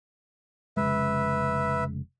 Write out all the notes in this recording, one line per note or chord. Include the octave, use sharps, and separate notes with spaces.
F1 C#3 G#3 B4 E5